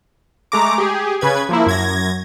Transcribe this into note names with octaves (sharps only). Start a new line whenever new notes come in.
G#3 A3 A#5 D6
G4 G#4
C#3 B4 G#6
F3 A#3 E4
F#2 G#6 A#6